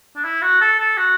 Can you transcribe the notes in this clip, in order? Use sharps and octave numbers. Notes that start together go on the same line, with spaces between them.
D4
E4
F#4
A4
A4
F#4